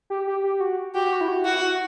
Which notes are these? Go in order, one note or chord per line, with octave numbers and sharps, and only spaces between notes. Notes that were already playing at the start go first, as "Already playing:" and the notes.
G4
G4
G4
F#4
F#4 G4
F#4
E4
F#4
E4 F#4
F#4